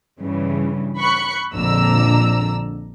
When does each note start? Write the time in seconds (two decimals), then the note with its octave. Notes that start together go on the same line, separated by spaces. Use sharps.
0.18 G2 C#3 E3
0.98 B5 C#6 F#6 C#7
1.54 A#1 F2 D3 D4 A#5 E6